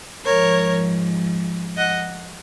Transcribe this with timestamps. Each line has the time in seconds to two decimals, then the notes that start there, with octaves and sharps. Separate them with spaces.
0.24 G#2 F3 A#4 C#5
1.77 D#5 F#5